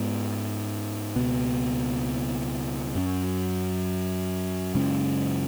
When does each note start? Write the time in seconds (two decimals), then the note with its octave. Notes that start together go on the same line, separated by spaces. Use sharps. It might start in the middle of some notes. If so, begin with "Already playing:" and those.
Already playing: G#2 G#3 B3
1.16 C#2 B2 B3
2.95 F#2 F#3 C#4
4.74 F#2 C#3 G#3 C#4